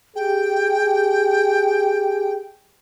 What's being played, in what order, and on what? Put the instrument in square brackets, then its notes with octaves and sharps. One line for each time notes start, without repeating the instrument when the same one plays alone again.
[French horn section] G4 G#4 [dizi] G5